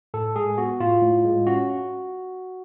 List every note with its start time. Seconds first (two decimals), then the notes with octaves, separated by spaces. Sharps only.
0.14 A2 A4
0.36 G#3 G#4
0.58 B3 F#4
0.80 A2 F4
1.02 A2
1.25 G#3
1.47 C#4 F#4